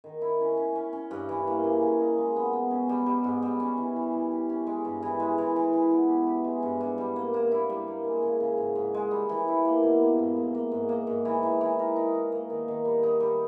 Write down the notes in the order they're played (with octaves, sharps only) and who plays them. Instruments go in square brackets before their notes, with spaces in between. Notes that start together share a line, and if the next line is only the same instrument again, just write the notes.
[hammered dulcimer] D#3
E4
C#4
C#4
C#4
C#4
G2
E3
A#3
C#3
C#3
D#4
G#3
B3
B3
C#4
G3
G3
G#2
G3
C#4
E3
G3
E3
G4
C#4
G#3
G2
E3
G#3
E3
E3
E3
B3
G4
G4
G#3
G2
G2
G3
A#3
A#3
E4
G3
A#3
G#3
C#3
C#3
G#2
G#2
G#3
G3
E3
E4
A#3
B2
A#3
G#2
A#3
A#3
G#2
A#3
G#2
E3
E3
E3
A#4
D#4
D#4
A#3
D#3
D#3
G3
D#4
G3